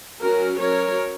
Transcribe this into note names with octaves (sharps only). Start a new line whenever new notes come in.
F#3 C#4 F#4 A#4
F#3 A#4 C#5
C#4